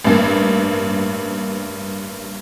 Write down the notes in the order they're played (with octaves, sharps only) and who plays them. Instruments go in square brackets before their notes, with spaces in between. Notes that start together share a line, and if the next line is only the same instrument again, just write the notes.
[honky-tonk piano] A1 G2 A#3